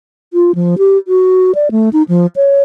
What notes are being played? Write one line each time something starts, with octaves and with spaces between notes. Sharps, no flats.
F4
F3
G4
F#4
D5
A3
D#4
F3
C#5